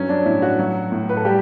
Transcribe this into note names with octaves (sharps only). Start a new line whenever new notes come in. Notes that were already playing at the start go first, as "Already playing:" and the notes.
Already playing: G2 F#3 C#4
D4
A2 E4
F#4
F#3
A2
B4
A4
G3 G4